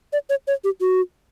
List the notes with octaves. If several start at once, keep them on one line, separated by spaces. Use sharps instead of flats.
D5
C#5
C#5
G4
F#4